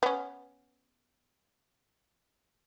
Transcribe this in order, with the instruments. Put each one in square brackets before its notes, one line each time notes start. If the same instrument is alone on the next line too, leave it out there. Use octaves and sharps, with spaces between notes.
[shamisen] B3 C#4